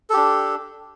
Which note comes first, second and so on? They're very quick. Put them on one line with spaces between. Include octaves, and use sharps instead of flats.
A4 G4 D4